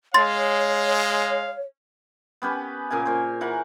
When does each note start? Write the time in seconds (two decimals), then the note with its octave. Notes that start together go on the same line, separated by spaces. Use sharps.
0.14 G#3 C#5 F5 C6 A6
2.42 B3 C#4 G4 B4
2.90 A#2 C#3 A#4 G#5
3.05 A#2 C5 C#5
3.41 E3 A#4 F#5